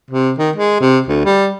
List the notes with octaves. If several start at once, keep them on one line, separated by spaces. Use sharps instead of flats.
C3
D#3
G#3
C3
D2
G3